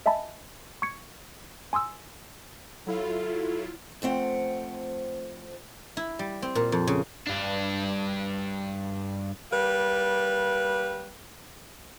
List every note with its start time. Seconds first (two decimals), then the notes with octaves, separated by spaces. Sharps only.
0.06 D#5 E5 G#5 A5 B5
0.82 C#6 G#6 C#7
1.73 G#5 C6 D#6 E6
2.87 F#3 E4 F4 A4
4.02 F2 A3 C4 F#5
5.97 E4
6.19 G3
6.42 C4
6.55 A#2
6.72 F2
6.87 C#3
7.27 G2 D4
9.52 G3 A#3 B4